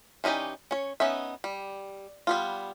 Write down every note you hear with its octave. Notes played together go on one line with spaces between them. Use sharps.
E3 C#4 D#4 G4 D5
C#4 C#5
B3 C#4 D#4 E5
G3
G3 B3 F4